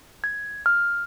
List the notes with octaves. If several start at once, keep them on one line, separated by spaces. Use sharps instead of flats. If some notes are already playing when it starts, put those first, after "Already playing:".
G#6
F6